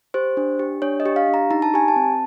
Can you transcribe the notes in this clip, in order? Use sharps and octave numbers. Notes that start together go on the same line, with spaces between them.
G4 C5
D4
G4
D4 C#5
D#5
G4
F5
D4
A#5
D#4 A#5
A5
G4 G#5
A5
C4